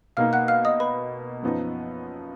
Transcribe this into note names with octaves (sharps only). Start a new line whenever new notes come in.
B2 A#3 D#4 F5 F6
F#5 F#6
F5 F6
D#5 D#6
B4 B5
F#2 F3 B3 D#4